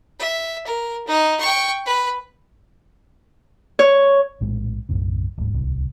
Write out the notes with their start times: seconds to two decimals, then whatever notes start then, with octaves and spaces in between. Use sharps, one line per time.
0.20 E5
0.67 A#4
1.07 D#4
1.40 G5 C#6
1.86 B4
3.79 C#5
4.41 A#1 A2 G#3
4.89 B1 F#2 A2 C#3
5.37 D1 G#2
5.53 D1 C2